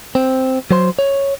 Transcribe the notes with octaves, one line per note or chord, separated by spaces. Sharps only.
C4
F#3 C5 C6
C#5